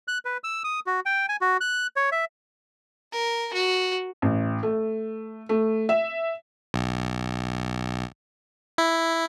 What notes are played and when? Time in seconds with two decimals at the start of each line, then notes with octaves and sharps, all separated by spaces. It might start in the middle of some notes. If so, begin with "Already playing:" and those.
0.08 F#6
0.25 B4
0.44 E6
0.64 D#6
0.87 F#4
1.06 G5
1.29 G#5
1.41 F#4
1.61 F#6
1.96 C#5
2.12 E5
3.12 A#4
3.54 F#4
4.22 A1
4.63 A3
5.49 A3
5.89 E5
6.74 B1
8.78 E4